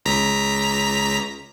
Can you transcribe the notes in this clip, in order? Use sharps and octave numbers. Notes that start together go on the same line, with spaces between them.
C#2 A#5 B6